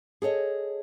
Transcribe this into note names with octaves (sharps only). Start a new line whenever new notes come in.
G#4 A4 C#5 D#5